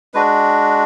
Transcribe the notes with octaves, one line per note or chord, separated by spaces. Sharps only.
G#3 D4 F#4 B4